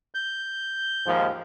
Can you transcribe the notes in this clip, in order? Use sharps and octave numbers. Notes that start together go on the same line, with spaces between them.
G6
D#2 G#2 F3